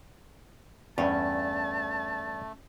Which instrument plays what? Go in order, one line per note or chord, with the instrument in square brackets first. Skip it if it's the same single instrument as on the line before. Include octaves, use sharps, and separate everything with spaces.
[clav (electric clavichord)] E2 G2 [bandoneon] A3 [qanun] C#4 [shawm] A5